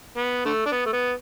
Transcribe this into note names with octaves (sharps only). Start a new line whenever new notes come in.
B3
D3 A3
D4
B3
A3
B3